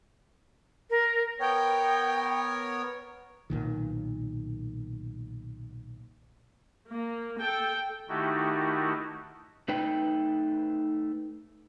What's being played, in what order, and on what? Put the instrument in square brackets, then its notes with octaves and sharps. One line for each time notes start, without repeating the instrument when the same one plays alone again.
[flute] A#4
[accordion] B3 A#4 C#5 [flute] G5
[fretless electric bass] B1 A#2 D#3
[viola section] A#3
A4 G5
[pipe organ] D#3 A3 D#4 E4 F#4 G4
[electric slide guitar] A3 D#4 B4 G5